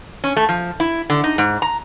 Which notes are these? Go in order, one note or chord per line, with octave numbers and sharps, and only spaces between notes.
C#4
A3
F3
E4
D3
D#4
G#2
A#5